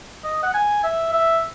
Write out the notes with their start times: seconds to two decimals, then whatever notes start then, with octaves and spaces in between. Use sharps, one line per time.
0.24 D#5
0.43 F#5
0.54 G#5
0.84 E5
1.13 E5